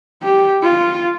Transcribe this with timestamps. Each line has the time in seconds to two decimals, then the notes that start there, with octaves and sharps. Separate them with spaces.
0.23 G4
0.62 F4